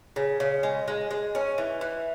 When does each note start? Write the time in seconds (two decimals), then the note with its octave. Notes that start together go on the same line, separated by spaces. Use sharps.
0.16 C#3
0.40 C#3
0.63 G#3
0.88 G#3
1.11 G#3
1.35 C#4
1.58 E3
1.81 E3